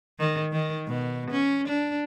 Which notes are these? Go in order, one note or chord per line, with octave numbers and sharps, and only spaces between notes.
D#3
D#3
B2
C#4
D4